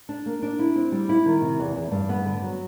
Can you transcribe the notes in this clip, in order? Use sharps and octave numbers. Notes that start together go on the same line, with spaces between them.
D4
A#3
D4
E4
C4
G3
E4
D#3
C3
E2
E2
G2
B3
D3
F#3